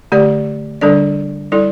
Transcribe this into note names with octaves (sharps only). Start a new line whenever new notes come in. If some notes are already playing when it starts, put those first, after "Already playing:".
D3 A3 G4 D5
D3 G3 D4 A4 D5
G3 E4 A4 D5